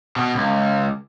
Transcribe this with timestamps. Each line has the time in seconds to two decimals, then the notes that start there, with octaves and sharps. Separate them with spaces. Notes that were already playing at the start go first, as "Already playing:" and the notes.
0.16 B2
0.35 C#2